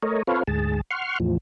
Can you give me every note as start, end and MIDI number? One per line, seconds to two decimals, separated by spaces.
0.03 0.23 57
0.03 0.23 70
0.03 0.23 73
0.03 0.23 75
0.27 0.43 60
0.27 0.43 65
0.27 0.43 69
0.27 0.43 71
0.27 0.43 73
0.27 0.43 77
0.47 0.81 38
0.47 0.81 44
0.47 0.81 68
0.47 0.81 81
0.90 1.19 78
0.90 1.19 84
0.90 1.19 85
0.90 1.19 89
1.20 1.38 40
1.20 1.38 45
1.20 1.38 53